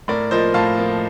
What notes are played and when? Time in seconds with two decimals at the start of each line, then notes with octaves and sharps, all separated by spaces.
0.08 A2 A#4 D5
0.31 F3 A#3 C5 D#5
0.54 A2 F5 A5
0.78 F3 A#3